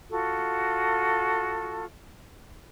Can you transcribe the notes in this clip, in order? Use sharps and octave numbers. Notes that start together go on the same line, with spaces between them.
F4 F#4 A4